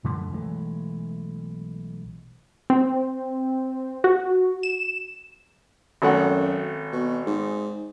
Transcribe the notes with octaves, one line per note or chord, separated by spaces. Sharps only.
F#2 D3 F3 A3
B1 E3 G#3 A3
C4
F#4
E7
G#1 F#2 A3 F#5
B2
G#2